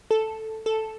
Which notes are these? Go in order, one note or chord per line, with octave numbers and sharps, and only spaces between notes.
A4
A4